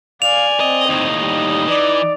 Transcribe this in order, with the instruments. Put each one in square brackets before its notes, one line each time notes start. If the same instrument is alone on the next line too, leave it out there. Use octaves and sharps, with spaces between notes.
[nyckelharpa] D5 G#5 [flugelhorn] F5 [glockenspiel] F7
[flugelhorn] C4 [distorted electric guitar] D#5
[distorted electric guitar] D#2 A2 [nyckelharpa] D#4 D#5
[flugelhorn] G3
[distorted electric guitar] E3 [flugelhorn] D5